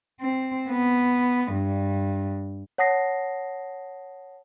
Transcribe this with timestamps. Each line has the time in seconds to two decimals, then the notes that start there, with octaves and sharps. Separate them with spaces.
0.21 C4
0.69 B3
1.52 G2
2.78 C#5 F#5 A5 D#6 A#6 C7